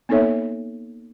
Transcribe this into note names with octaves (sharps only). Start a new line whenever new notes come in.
A#3 B3 D#4 A4 C#5 E5